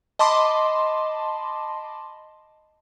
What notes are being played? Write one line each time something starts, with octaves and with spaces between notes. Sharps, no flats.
D#5 A5 B5 C6 D6